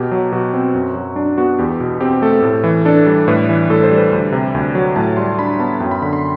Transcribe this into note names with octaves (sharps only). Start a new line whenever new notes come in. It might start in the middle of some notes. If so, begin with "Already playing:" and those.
Already playing: B2 G4
F#3
B2 F#4
C4
F#2
F#3
D4
B3 F#4
E2 G4
B2
C4 G4
A3 A4
A2
E3
D4 A4
G3
A2 B4
E3
A2 A4
C5
G3
B4
D2
C3
D2
F#3
A2 A5
G3 C6
D4 B5
B3 A5
F#2 G5
B5
D3 B5
C6